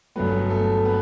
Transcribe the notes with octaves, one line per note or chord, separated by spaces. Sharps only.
G1 G2 F#3 A3 B3 B4
A3 A4
B3 B4